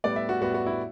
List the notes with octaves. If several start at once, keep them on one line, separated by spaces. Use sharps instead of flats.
A2 G3 B3 D5
E5
F#4
A2 G3 B3 F#4
F#4
E4